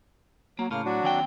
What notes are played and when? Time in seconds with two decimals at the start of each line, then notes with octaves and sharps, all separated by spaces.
0.59 F#3 A#3
0.71 A2 C#3 A#3 F6
0.85 F#3 D4 F#4
1.03 D#2 C4 G5